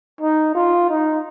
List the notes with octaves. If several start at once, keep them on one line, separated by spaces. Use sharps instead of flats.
D#4
F4
D#4